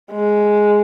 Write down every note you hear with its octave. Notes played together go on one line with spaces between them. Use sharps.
G#3